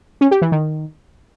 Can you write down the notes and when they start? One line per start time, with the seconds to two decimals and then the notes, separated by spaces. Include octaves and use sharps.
0.21 C#4
0.31 G4
0.42 E3
0.52 D#3